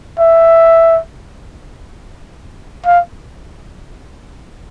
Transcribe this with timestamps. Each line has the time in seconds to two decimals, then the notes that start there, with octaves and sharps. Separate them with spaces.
0.20 E5
2.86 F5